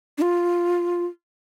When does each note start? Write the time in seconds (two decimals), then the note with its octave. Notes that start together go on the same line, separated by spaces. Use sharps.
0.18 D4
0.22 F4